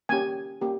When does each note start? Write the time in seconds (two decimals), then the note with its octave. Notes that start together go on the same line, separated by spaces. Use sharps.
0.09 A#3 C#4 G4 G#5
0.61 A#3 C#4 G4